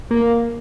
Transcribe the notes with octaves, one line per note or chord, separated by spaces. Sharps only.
A#3